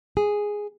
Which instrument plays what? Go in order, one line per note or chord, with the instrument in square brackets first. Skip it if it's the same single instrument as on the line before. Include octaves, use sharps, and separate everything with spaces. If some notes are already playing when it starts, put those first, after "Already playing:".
[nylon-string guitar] G#4